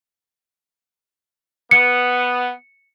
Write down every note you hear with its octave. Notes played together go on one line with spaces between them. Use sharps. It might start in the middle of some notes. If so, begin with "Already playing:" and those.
B3 C#7